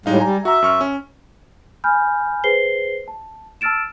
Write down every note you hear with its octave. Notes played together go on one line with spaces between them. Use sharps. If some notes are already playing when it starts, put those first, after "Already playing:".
A2 G3 G#3 D#4 F5
G3 G#5 A#5
F#4 E5 A#5
F#2 C#6 F6
C#4
G#5 B5 F6 G6
G#4 B4 C5 C7 G7
A5
A5 E6 F6 A6 D7 E7